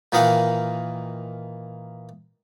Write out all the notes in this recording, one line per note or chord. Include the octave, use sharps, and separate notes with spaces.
A#2 D#3 E3 D#4 F5 F#5